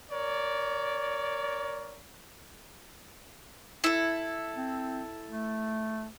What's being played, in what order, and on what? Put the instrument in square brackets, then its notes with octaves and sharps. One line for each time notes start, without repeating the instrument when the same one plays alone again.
[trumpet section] A#4 C#5 D5
[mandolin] E4 A4
[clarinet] C4
A3